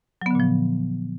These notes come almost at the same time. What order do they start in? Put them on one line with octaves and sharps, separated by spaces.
F#3 B3 D3 A#2 F3